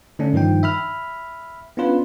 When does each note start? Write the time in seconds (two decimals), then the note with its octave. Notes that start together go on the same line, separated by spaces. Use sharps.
0.19 D3 A3 C#4 D4
0.33 G2 D#3 F3 D#4 G5
0.63 E5 B5 F6
1.77 B3 C#4 D4 F4 B4